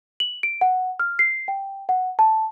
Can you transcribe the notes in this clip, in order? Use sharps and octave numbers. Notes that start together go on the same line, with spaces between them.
F#7
D7
F#5
F6
C7
G5
F#5
A5